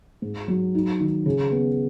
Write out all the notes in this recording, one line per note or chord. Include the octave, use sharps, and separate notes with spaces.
G#2
F#3
D#4
D#3
C#3
B3